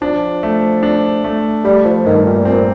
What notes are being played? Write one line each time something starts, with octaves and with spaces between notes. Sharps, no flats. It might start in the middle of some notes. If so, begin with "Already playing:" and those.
F3 D4
A3
D4
A3
G3 A3
F3
G2 D#3
A#2
A#2 C4